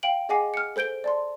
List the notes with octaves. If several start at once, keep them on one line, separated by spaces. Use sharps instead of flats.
F5 G5 D7 F#7
G#4 D#5 F#5 G#5 D6 C7
F6 C#7
A4 C5 G6 D7 G7
D5 A5 C6